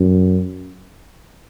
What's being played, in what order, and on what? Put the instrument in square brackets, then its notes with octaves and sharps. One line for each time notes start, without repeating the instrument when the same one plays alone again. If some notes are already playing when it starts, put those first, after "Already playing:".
Already playing: [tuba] F#2